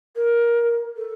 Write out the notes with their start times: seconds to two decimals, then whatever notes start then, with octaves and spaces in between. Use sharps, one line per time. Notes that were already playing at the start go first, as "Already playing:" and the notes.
0.16 A#4
0.96 A4